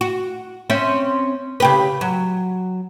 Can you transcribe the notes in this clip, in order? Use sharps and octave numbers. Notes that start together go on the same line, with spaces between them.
F#4
C4 C#4 E5
C#3 G4 B4
F#3